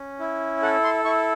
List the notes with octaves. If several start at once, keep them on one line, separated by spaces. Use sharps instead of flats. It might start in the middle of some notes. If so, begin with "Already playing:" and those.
Already playing: C#4
E4
A4 F#5
C6
E4 C#6